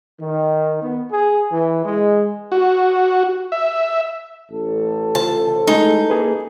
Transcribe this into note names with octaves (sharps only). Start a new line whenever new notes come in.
D#3
B3
G#4
E3
G#3
F#4
E5
A1 A4
C#3 F4 C5 A5
G#3 A3 D#4 G#4
A#3 G#4 B4